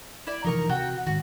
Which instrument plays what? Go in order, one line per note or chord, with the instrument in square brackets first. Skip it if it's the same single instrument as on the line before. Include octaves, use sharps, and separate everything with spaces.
[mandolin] E4 D5
[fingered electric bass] C3 E3 F3 [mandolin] D#4 A#4 C#6
[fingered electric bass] C3 [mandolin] F#4 F#5 G5
[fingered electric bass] G#2 D#3 [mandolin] F#4